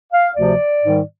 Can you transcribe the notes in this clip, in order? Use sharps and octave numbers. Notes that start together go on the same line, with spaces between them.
F5
D2 C3 F3 D5
G#2 D#3 G3